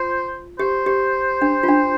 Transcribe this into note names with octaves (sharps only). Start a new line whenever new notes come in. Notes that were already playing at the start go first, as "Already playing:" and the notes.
Already playing: F4 C5
G4 C5
G4
D4
F4
D4